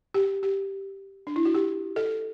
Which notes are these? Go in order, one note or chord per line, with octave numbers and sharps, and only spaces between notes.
G4
G4
D4
E4
F#4
G4
A4